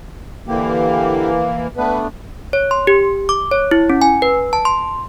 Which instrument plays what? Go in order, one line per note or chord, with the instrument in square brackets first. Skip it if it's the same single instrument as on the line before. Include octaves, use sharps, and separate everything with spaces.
[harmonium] D3 G4 [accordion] E3 A#3
[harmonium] A3 B3 D4 [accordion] B4
[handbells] C#5
C6
G4
D6
C#5
E4
C#4
G#5
B4
A5
C6